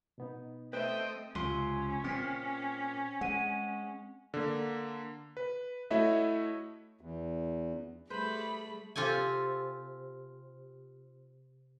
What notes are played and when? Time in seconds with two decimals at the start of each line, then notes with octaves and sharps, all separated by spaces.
0.18 B2 B3 D#4
0.73 A3 C4 B4 C5 D#5 E5 G5
1.35 C#2 C3 C#4 F4 C6
2.04 A#2 C4 B6
3.21 G#3 F#5 D#7
4.34 D3 A#3
5.37 B4
5.91 A3 E4 F#4 C#5 D#5 E5
7.01 E2
8.10 G3 A3 G#4 B4 C5 B5
8.96 C3 C4 F4 G4 A4 G#5